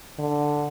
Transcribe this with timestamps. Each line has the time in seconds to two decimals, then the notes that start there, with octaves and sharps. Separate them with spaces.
0.19 D3